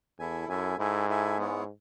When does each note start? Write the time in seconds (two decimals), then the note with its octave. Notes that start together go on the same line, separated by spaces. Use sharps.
0.19 E2 E4 A4 E5 G#5
0.49 F#2 E4 A4 E5 G#5
0.78 G#2 E4 A4 E5 G#5
1.08 E4 A4 E5 G#5
1.38 G#3 B3 E4 G#4 C#5